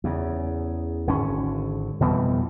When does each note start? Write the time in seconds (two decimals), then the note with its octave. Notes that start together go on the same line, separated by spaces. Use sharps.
0.04 E2 C#3
1.07 G#1 D3 C#4
2.00 F2 B2 E3 G3